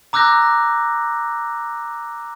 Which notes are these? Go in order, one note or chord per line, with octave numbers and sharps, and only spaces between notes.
A#5 D6 E6 F#6 G6 A#6